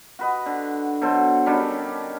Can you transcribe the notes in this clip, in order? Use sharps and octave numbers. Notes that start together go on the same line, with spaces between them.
F#4 B4 D#5
D3
B2 F#3 A4 C5
D#3 G3 C#4 D4